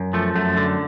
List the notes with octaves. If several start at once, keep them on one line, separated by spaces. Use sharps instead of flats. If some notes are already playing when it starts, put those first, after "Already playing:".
Already playing: F#2
F3 A3
F#2 A3
D3